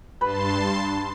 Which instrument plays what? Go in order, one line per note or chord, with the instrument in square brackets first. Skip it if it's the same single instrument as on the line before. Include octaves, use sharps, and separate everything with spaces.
[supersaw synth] G2 A5 C6 [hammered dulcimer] B4 B5